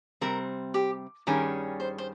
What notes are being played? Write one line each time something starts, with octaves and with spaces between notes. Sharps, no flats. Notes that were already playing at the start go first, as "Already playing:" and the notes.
C3 G3 C4 A#4
G4
G2 D#3 G3 C#4 G#4 A#4
C5
C5